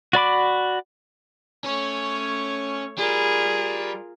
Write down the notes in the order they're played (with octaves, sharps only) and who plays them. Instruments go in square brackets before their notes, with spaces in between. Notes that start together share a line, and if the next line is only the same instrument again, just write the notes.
[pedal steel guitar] F#4 D5 B5 D6
[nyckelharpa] A3 C#5 [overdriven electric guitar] C#4
[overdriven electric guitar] G3 [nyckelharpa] F4 A#4 [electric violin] G#4